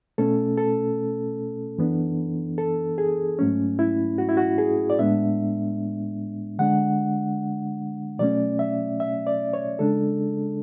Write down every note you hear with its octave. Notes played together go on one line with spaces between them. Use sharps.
B2 A3 C#4 A4
A4
F#2 E3 B3 D4
A4
G#4
G#2 F#3 A3 C#4
E4
F#4
E4
F#4
G#4
D5
A2 G#3 B3 D4 E5
D3 G#3 D4 F#5
B2 F#3 A3 C#4 D5
E5
E5
D5
C#5
C#3 G#3 D4 A4